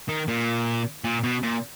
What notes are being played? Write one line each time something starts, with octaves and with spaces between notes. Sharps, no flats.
D#3
A#2
A#2
B2
A#2